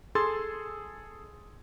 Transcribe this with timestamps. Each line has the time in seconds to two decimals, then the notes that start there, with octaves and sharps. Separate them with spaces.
0.15 G#4 A4 C6 E6 A6